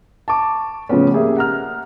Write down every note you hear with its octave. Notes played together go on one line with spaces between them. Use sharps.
A5 C#6 D6
A2 C#3 F3 A3 B3 C#4
A#3 G4 G#4 E5
F#5 A#5 F6